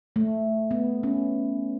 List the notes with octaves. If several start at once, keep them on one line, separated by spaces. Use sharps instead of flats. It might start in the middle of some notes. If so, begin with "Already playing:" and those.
A3
B3
C#4